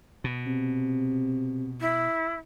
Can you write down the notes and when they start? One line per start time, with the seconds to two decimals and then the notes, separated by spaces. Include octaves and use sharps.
0.24 B2
0.46 C3
1.81 E4